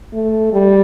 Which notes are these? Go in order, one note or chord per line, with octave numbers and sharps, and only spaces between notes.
A3
G3